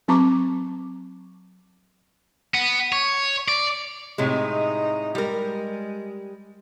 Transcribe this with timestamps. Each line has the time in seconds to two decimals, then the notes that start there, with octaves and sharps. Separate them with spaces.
0.08 F#3 C4 A5 A#5 C#6 D6
2.54 B3
2.92 C#5
3.48 D5
4.18 A2 C3 G#3 D#4
5.15 G3 G#3 A#4